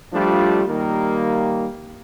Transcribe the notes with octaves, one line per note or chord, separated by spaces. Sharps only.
F3 G3 A3 D4 F4
D#3 G3 A#3